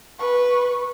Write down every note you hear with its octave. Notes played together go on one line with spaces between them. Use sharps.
B4 C#6